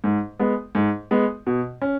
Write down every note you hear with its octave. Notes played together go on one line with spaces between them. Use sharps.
G#2
G#3 B3
G#2
G#3 B3
B2
C#4